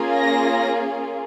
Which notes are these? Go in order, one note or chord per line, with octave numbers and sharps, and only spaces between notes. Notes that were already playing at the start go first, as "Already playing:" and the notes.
Already playing: A#3 C#4 F4 G#4
A#6